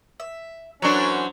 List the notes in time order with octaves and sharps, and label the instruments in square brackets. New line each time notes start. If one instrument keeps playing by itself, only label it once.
[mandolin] E5
[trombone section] E3 C#4 C5 [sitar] F#3 D4 [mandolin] F#4 A#4 F#6